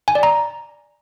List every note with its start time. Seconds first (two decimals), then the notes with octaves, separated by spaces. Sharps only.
0.08 G#5
0.15 D5
0.23 A#5